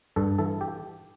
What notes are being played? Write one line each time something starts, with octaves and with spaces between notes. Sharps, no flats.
G2 A4
E3 A4
G4